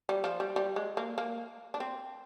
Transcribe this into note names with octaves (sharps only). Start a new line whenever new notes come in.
G3
F3
G3
G3
G#3
A#3
A#3
D4
C4